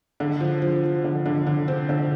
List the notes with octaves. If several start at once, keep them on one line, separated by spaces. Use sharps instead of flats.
D3
F3
F3
F3
D3
D3
D3
C4
D3